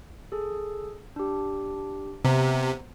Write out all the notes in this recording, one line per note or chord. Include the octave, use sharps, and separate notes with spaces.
G#4 A4
D4 G4
C3 B3 C5 A#5